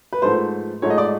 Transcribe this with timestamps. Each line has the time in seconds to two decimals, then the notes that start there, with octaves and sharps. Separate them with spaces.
0.13 B4
0.22 G#2 F3 A3 C5
0.82 G#2 F3 A3 C#5
0.90 D#5
0.98 D5